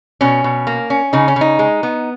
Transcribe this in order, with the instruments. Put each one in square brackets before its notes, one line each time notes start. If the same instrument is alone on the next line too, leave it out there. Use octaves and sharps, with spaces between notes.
[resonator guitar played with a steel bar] B2 C#4
B2
A#3
C#4
C#3 D#4
C#4
C#3 D#4
G#3
B3